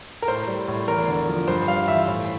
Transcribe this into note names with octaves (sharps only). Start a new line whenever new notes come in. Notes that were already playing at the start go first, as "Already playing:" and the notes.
A#4
A2 C5
G3
A2
E2 A#4
D3
F3
G2 C5
G3 F5
E3 E5
A2